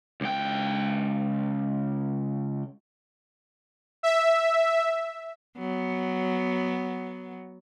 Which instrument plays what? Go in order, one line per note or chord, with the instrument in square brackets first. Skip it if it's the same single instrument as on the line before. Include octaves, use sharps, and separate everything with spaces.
[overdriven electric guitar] C#2 G5
[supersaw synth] E5
[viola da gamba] F#3 B3